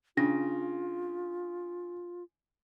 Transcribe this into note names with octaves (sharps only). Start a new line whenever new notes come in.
C#3 D4 F4 A#6